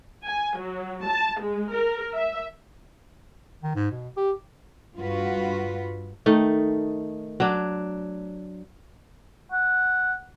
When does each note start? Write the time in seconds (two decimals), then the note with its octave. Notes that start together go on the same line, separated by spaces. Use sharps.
0.23 G#5
0.58 F#3
1.05 A5
1.41 G#3
1.72 A#4
2.15 E5
3.63 D#3
3.76 G#2
3.91 B2
4.17 G4
4.98 G2 F4 F#4 B4
6.26 D#3 A3 D#4
7.40 F#3 D4
9.52 F#5